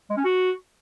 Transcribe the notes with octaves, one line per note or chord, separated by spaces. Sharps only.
G#3
C#4
F#4